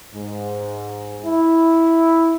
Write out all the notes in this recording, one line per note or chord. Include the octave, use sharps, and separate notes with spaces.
G#2
E4